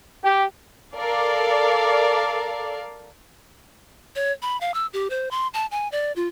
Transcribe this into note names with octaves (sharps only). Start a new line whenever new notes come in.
G4
A4 A#4 D5 F5
C#5
B5
F5
E6
G4
C5
C6
A5
G#5
D5
F4